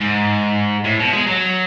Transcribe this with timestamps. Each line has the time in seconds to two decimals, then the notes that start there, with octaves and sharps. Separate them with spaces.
0.01 G#2
0.84 A2
0.99 B2
1.13 G#3
1.27 F#3